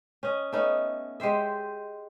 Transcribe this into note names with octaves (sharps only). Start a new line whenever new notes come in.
C#4 D#5
A3 B3 C#4 D#4
G#3 G4 C5 E5